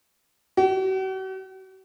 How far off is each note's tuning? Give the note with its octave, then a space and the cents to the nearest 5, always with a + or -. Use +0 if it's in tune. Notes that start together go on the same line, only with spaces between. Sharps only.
F#4 +45